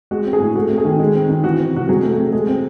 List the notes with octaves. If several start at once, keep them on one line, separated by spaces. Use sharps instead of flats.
G#3 F#4
C4
G#4
A2
A3 F#4
C4
G#4
D#3
G#3
C4
D#3
E3 F#4
C4
C3 F#4
F#3 G#4
A3
F#4
C4
G#3 G#4
C4